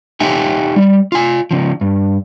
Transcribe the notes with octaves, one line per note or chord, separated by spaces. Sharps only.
D#4 G4 E5 G5 G#5
G3
F4 G#5
C#3 F3
G2